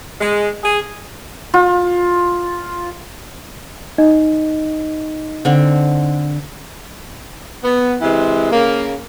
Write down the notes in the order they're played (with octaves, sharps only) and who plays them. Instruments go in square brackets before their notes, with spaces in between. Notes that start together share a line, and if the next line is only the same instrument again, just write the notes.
[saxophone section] G#3
G#4
[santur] F4
[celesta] D#4 D#5
[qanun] D3 C4
[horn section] B3
C3 E3 G#3
C#3 A#3